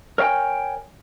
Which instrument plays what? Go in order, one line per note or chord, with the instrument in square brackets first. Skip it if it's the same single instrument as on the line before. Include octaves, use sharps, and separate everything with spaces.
[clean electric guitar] A#4 C#5 F5 G5 G#5